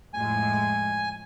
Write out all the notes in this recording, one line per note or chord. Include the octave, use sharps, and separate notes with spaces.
F2 A2 G#3 G#5